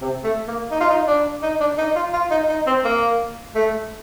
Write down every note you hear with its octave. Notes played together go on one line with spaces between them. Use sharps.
C3
A3
A#3
D#4
F4
D#4
D4
D#4
D4
D#4
F4
F4
D#4
D#4
C4
A#3
A3